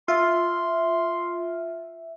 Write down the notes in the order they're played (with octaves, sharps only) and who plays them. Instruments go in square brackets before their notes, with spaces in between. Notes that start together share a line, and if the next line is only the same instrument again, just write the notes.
[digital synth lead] F4 [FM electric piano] E5 [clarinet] C6